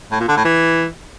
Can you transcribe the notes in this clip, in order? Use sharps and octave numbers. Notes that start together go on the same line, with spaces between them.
A2
A#2
D3
A2
E3